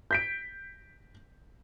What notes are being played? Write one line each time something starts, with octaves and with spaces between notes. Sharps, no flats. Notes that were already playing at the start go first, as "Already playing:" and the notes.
G6 B6 D7